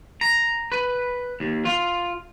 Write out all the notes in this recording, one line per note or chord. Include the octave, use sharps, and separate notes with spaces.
A#5
B4
D#2
F4